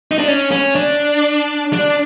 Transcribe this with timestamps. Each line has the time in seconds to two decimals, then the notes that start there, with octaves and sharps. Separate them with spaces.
0.11 D#4
0.19 D4
0.28 C#4
0.52 C#4
0.75 D4
1.73 D4